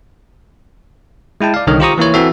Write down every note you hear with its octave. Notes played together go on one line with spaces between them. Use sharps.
G#3 E4 G5 A5
D5 F5
C2 D3 D#3 C#5 D#5 F6
F4 G4 C5 A#5 C#6 D#6
E3 A#3 E4 C#5
E3 C4 F#4 A4 E5